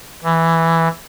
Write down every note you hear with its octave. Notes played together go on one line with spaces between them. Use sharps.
E3